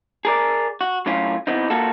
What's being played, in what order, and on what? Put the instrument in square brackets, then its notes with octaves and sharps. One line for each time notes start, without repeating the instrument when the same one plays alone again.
[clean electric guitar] G#4 A#4 D5
F#4
F#2 A2 C#4 F4
E3 B3 C4 D#4
A#3 F4 F#4 A4